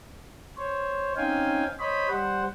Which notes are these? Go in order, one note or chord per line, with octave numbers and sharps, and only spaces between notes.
C5 C#5
C4 C#4 D#4 F5 G5 G#5
C5 C#5 D#5 B5
G3 C5 F#5